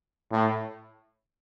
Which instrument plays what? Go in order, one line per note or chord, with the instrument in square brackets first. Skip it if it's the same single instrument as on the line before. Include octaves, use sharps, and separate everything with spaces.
[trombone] A2